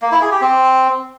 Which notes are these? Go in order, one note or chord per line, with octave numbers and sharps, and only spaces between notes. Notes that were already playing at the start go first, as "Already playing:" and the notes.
A#3
E4
G#4
G4
C4